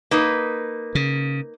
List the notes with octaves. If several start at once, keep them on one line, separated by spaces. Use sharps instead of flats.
A#3 D#4 B4
C#3